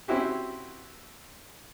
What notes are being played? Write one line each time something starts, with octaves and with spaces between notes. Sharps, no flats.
C4 C#4 E4 F#4 G4